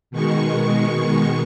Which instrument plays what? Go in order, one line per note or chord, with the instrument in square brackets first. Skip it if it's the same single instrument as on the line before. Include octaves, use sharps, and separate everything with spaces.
[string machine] B2 D#3 G#3 C#6